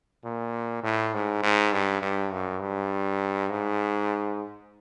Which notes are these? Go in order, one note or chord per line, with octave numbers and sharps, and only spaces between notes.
A#2
A2
G#2
G#2
G2
G2
F#2
G2
G#2